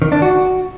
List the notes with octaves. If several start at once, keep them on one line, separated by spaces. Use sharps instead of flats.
D#3
D4
F#4